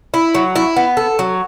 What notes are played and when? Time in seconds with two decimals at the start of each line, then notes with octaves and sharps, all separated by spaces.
0.14 E4
0.35 F#3
0.56 E4
0.76 B3
0.97 A4
1.19 F#3